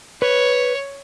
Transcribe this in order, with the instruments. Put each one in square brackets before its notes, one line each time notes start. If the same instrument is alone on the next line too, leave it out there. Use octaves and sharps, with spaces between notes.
[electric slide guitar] B4 [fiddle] C#5